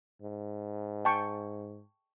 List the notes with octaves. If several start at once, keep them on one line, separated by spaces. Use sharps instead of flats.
G#2
G5 A5 C#6